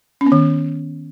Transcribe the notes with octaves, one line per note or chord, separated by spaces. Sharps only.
C#4
B3
D#3